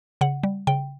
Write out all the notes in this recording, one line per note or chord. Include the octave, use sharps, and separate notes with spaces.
C#3 F#5
G3
C#3 G5